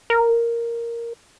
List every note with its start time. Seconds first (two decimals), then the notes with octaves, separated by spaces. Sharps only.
0.10 A#4